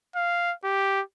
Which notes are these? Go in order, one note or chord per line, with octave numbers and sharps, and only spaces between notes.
F5
G4